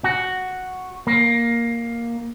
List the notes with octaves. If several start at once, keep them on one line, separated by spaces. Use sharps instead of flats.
F#4
A#3